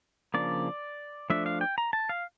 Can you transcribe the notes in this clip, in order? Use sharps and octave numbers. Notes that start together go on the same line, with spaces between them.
C#3 F3 A#3 D4 D5
F3 A3 D4 E5
F5
G5
A#5
A5
F5